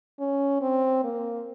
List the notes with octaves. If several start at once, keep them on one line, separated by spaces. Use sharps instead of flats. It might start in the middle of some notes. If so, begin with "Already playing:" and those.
C#4
C4
A#3